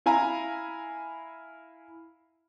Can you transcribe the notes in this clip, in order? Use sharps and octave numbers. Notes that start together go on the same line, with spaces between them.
E4 F5 G#5 A#5 B5